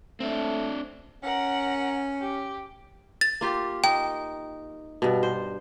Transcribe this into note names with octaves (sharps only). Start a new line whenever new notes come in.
A3 C4 D4
C#4 A#4 F#5
G4
A6
A#3 F4 G4
D#4 G5
G2 B2
C5